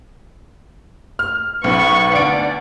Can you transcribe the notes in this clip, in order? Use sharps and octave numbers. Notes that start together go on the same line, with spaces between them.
F6
B1 B3 C#6
D2 D5 D7